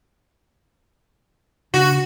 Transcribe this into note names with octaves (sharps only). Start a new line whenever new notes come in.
C#3 D4 F#4